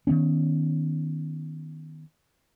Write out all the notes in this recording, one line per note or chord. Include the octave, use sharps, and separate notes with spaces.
D#3 F#3 B3 C#4